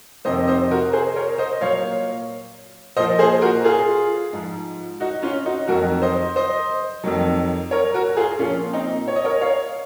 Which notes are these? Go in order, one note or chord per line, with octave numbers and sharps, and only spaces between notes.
F2 C3 D#3 C5 D#5
C5 D#5
F#4 A#4
G#4 C5
A#4 C#5
C5 D#5
A#2 F#3 C#5 F5
A#2 F3 C5 D#5
G#4 C5
F#4 A#4
F4 G#4
G#2 F3
D#4 F#4
C#4 F4
D#4 F#4
F2 D#3 F#3 F#4 A#4
C5 D#5
C5 D#5
F2 D#3 F#3
A#4 C#5
F#4 A#4
F4 G#4
A#2 F3 C#4 F4
C4 D#4
C#5
D#5
A#4 C#5
C#5 F5